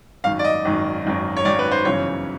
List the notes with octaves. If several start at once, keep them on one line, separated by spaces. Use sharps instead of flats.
G#1 F#2 D#3 F5
D5
D#5
G#1 F#2 D#3
G#1 F#2 D#3
C#5
G#1 F#2 D#3 D5
B4
C5
G1 F#2 C#3 E3 C#5